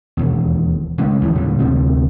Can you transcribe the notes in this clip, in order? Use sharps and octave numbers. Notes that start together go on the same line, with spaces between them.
E1 D#2
C#3 G#3 C#4
D#2 E3 F3
A#2 D3 G3
D2 C3 D#3 B3